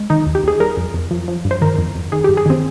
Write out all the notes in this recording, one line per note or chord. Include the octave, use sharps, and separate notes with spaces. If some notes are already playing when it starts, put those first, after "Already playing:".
Already playing: G#3
D#3 D#4
D#2
G4
D#2 G#4
G3 A#4
F2
F2
F3
F3
G2
C5
D#3 A#4
F2
F2
D#3 G#4
G2 G4
G#4
D#3 C4